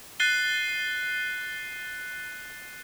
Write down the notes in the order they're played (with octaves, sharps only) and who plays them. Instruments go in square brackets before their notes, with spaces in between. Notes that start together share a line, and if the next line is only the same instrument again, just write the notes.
[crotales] F#6 A6 C7 D#7 G7